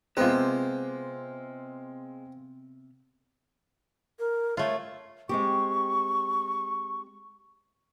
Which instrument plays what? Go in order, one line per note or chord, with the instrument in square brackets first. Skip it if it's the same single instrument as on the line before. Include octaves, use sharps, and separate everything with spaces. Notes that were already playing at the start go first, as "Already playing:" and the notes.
[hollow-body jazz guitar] C3 B3 [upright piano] G#3 F4 [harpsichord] C4
[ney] A#4
[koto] A3 F4 [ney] C#5
[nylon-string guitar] G#3 C4 G4 [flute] C#6